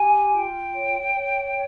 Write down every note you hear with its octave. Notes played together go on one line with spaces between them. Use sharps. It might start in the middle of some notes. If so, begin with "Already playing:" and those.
Already playing: G4 G#5
F4 G5
C#5
C#5